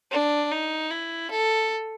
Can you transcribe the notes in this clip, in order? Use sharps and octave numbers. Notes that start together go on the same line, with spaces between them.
D4
D#4
E4
A4